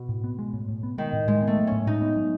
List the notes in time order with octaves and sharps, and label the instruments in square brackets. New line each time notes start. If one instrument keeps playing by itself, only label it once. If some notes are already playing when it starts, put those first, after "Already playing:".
Already playing: [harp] B2
[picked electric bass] A2
B3
G#3
A2
A2
B3
[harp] D#3 [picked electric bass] G#3
[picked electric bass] A2
[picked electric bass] A2 [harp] G#3
[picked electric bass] B3
[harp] A3
[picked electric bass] F#3
[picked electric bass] A2 [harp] C#4
[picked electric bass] A2 [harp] D#4
[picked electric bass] B3
F#3